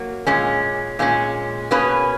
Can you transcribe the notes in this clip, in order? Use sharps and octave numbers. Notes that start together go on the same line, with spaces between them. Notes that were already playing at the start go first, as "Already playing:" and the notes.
Already playing: F#3 A#3
A#2 G#3 C#4
A#2 G#3 C#4
B2 A#3 C#4 G#4 B4